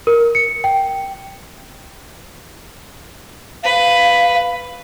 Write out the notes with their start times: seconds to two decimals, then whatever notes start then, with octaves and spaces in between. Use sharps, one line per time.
0.07 A#4
0.35 C#7
0.64 G5
3.64 B4 F5